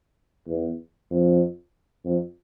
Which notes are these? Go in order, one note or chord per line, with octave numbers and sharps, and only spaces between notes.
E2
F2
F2